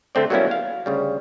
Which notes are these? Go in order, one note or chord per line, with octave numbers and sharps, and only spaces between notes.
D3 A3 C4 D5
F#3 G3 A#3 B3 C#4 E4
F5
D2 C#3 G3